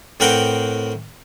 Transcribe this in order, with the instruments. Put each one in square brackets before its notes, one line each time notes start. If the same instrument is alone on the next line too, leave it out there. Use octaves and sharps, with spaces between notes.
[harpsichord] A2 C4 A#4 B4 F#5 G5